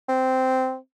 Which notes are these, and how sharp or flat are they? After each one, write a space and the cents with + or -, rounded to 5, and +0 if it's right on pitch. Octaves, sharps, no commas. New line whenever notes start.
C4 -10